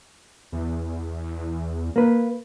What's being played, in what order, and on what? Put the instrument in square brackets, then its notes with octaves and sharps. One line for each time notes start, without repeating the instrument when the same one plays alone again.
[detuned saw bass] E2
[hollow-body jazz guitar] A#3 B4